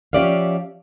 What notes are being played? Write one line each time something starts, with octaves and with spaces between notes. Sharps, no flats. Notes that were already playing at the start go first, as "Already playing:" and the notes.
F3 C#4 G4 D5 E5 F5